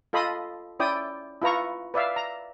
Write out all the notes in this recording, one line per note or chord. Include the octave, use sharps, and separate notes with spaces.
F4 A4 D#5 B5 C6 D#6
C#4 E4 D5 G5 D#6
E4 F4 B4 A#5 C#6
B4 D5 E5 F5
A#5